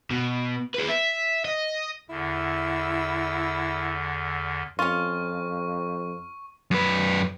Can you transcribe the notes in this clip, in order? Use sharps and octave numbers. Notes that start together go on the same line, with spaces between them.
B2
G#4 B4
E5
D#5
E2 D3 E4
F2 C#4 F4 C#6
F#2 B4